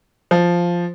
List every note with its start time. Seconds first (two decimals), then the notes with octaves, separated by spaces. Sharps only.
0.31 F3